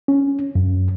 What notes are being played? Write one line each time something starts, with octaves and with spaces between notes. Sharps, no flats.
C#4
F#2